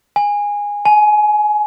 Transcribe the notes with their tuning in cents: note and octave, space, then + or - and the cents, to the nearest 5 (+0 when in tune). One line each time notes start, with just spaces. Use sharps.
G#5 -15
G#5 +25